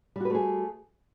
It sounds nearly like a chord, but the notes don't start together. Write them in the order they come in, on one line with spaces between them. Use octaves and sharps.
G3 F#4 B4 A3 G#4